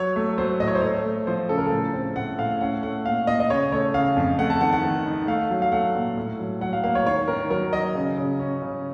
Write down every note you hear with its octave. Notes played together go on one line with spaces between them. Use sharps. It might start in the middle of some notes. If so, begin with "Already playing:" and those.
Already playing: F#3 C#5
A3
F#3 C5
A2 D#5
C#5
C5
A3 C#5
A3
F3 C5
C#3 A4
A#4
A4
A2
C4
A2 F#5
A2 F5
C#4 F#5
A3 F#5
A#2 F5
A#2 D#5
D#5
C#3 C#5
A3 C#5
C#3 F5
F2
A3 F#5
A5
D#3 F#5
F#5
D#3
D#4
A3 F5
F#3
F5
A3 F#5
A#2
A2
F#3
F#3 F#5
F5
A#3 F5
C#5
D#3 C#5
D#3 A#4
F#3 A#4
F#3 D#5
C#3
C#3
C#4
C#3